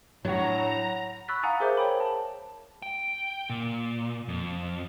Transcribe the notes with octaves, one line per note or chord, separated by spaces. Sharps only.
A2 F#3 D4 F#4 C#5 F#5 A#5
B5 C#6 E6 F#6 A6 B6
F5 F#5 G#5 A#5 D#6 A6
G#4 A#4 C5 E5 D6 G6
A#4 C#5 G5 B5
A5
G5
A#2
F2